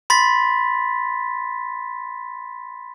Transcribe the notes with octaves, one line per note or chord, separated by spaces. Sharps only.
B5 C6 A6 B6